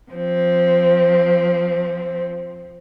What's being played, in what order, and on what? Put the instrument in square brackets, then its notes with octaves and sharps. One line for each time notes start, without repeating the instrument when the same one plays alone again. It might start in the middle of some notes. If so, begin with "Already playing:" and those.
[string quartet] F3 C4